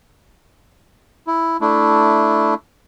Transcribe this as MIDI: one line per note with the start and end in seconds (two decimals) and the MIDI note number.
1.27 1.57 64
1.61 2.54 57
1.61 2.54 62
1.61 2.54 64